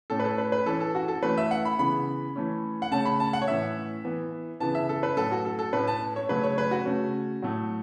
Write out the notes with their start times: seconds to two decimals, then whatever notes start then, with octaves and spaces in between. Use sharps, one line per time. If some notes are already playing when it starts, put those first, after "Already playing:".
0.10 A2 A3 C#4 A4
0.19 B4
0.24 A4
0.38 B4
0.52 B4
0.66 E3 C#4 A4
0.80 A4
0.95 F#4
1.08 A4
1.22 E3 A3 C#4 B4
1.37 E5
1.51 F#5
1.65 B5
1.79 C#3 E3 B3 B5
2.36 E3 A3 C#4
2.82 F#5
2.91 C#3 A3 C#4 A5
3.05 B5
3.20 A5
3.33 F#5
3.42 C#5
3.48 A2 E3 C#4 E5
4.04 E3 B3
4.60 C#3 E3 B3 A5
4.75 E5
4.89 A4
5.03 B4
5.17 A2 F#3 C#4 A4
5.32 F#4
5.45 A4
5.59 A4
5.73 A2 A3 C#4 B4
5.88 A5
6.16 C#5
6.29 C#3 F#3 A3 C#4 B4
6.43 C#5
6.58 B4
6.71 F#4
6.85 C#3 A3 C#4
7.42 A2 F#3 A3